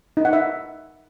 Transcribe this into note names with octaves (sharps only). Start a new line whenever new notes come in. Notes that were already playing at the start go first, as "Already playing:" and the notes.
D#4
F#5
E5